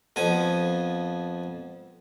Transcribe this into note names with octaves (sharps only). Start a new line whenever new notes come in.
F2 F3 B3 G#5